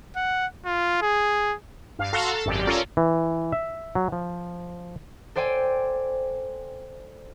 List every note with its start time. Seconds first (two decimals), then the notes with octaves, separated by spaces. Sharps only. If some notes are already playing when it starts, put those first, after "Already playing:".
0.16 F#5
0.65 F4
1.02 G#4
1.99 G2 F5
2.13 F#4 A4 F5 A#5 C6
2.30 A4 A5
2.45 G#1 F#2 G4 D5
2.67 C#4 F4 A4 A#4 D5
2.97 E3
3.52 E5
3.95 F#3
4.12 F3
5.36 A4 C5 D5 G5 G#5